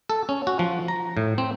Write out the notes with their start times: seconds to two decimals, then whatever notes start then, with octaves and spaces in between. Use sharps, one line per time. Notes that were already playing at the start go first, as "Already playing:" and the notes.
0.10 A4
0.29 C#4
0.47 F#4
0.59 F3
0.88 A#5
1.17 A2
1.38 C4